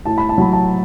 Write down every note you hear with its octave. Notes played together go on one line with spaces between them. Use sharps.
A2 A5
B5
A5
F#3 B5
A5